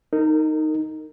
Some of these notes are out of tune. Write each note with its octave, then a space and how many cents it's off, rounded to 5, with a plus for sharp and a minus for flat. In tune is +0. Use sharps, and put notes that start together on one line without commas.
D#4 +0 A#4 -30